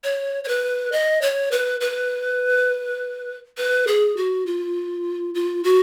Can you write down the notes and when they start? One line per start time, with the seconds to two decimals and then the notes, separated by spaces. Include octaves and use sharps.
0.04 C#5
0.44 C#5
0.48 B4
0.92 D#5
1.22 C#5
1.51 B4
1.81 B4
3.58 B4
3.87 G#4
4.17 F#4
4.46 F4
5.35 F4
5.64 F#4